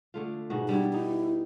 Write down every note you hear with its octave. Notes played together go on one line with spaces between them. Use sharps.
D3 A3 F4
G#2 B2 F#4
G3 B3 D4 E4
D#4 E4